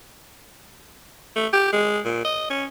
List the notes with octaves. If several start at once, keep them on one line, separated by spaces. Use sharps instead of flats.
A3
G4
G#3
A#2
D#5
C#4